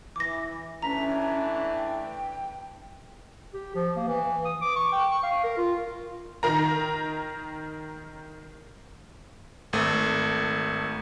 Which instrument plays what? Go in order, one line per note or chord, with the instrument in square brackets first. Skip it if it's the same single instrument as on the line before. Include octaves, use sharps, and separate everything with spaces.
[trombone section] E3 [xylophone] D6 A#6
[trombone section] E3 A3 D4 [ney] C#4 [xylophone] A#5 B6
[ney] G5
[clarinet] G4
F3
A#3
E3
D#6
D6
C#6
G5
C#6
F5
A#4
F4
[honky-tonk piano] D#3 A#4 A#5
[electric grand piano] G#1 A3